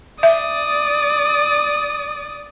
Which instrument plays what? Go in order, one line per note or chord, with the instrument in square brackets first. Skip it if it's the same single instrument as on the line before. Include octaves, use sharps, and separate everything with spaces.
[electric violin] D5 D#6 [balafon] E5